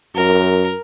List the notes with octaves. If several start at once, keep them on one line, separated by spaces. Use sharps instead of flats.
F#2 A#4